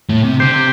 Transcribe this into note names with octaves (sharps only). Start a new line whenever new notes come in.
A2
C3
D3 G4 C5
C3